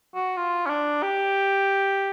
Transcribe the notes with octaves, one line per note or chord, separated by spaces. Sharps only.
F#4
F4
C#4
D4
G4